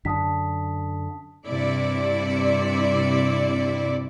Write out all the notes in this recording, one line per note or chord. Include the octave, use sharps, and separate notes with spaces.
F#2 D3 A5 D#6 B6
G2 C3 E4 D5